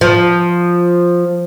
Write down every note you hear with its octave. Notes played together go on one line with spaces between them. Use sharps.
F3